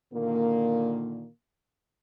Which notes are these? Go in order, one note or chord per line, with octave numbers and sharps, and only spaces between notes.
A#2 D3 D#3 A#3